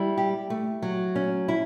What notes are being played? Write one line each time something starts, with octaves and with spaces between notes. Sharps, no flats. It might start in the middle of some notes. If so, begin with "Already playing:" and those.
Already playing: G3 E4
G4
A3
F#3
C#4
E4